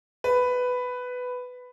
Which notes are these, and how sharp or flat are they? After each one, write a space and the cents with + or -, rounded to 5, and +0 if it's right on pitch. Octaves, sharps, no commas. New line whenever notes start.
B4 +10